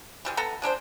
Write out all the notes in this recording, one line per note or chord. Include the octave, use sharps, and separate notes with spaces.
E3 G3 G#3
B3 A4 E5 A#5
G#3 D4 A#4 C5